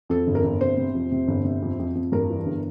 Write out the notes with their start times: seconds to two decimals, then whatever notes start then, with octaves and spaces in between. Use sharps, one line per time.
0.09 F2 A4
0.27 G1
0.35 A#4
0.44 G1
0.61 C3 C5
0.77 C3
0.95 F2
1.11 C3
1.28 G1
1.45 C3
1.62 F2
1.79 F2
1.95 F2
2.12 G2 A#4
2.30 E3
2.46 G1